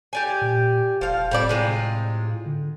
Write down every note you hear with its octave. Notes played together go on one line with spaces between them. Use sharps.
G4 D5 G#5
A#2
E1 F3 F5
A2 G3 C4 D5
C3 G#3 F4
D3